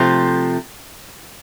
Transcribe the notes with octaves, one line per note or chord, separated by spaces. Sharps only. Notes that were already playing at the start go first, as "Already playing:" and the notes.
Already playing: C3 F3 A3 C4